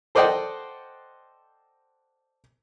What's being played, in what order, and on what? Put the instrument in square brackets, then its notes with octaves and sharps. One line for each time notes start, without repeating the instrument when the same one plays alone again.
[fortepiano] A4 C5 D5 D#5 F#5 G5